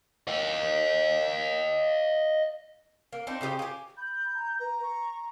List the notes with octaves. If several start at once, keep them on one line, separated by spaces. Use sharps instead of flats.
D#5 F5
A#3
C4 D4 D#4
C#3 C4 G4 D#5
G4 G#5
B5 G6
A#5
B4 A#5
C#6